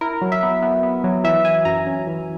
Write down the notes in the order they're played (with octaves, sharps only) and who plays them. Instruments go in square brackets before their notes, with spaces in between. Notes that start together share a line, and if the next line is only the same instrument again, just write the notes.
[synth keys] E4 A#4
F#3
E5
B3
B3
B3
F#3
E3 E5
E3 G#5
F#2 A#5
C#4
E3